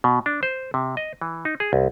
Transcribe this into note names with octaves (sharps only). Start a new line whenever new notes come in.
B2
D4
C5
C3
D#5
E3
D#4
G#4
C2